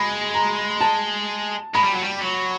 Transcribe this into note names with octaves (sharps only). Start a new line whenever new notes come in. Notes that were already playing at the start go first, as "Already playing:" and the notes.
Already playing: G#3 B5
A#5
A5
G#3 B5
G3
F#3
G3
F#3